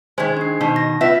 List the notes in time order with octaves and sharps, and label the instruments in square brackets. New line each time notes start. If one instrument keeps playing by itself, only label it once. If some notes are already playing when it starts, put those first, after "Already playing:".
[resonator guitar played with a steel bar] D#3 G#3 [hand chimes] C5 G#6
[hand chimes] D4 C7
[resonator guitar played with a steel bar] B2 D#3
[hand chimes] A#6
[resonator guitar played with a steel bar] B3 E5 [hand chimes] F4 B4